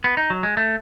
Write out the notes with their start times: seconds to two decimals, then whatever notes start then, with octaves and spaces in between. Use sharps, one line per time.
0.04 B3
0.17 D#4
0.30 F#3
0.43 G#3
0.57 A3